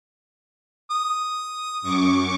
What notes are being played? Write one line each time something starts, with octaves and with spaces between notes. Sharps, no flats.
D#6
F#2 C#6 D6